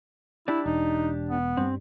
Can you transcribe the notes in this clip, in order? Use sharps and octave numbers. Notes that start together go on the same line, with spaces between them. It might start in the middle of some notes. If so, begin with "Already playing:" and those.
D4 E4 G4 D5
E1 D#4
B3
G2 G3 C4